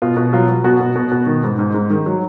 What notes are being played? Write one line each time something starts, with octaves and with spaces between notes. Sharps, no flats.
B2 F4
B2
F#3 F4
F#3
B2 F#4
B2
B2
B2
D#3
G#2
G#2
G#2
D#3
F#3